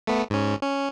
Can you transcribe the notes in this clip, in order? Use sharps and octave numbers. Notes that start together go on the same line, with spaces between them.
A3 B3
G#2 C#4
C#4